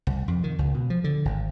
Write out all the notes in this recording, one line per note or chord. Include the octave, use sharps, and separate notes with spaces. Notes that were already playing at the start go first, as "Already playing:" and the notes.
C2
F2
D#3
C#2
B2
F3
D3
G#1